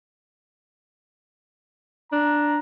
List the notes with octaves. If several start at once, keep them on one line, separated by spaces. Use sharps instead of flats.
D4 A#5